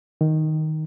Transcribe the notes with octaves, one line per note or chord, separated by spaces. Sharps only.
D#3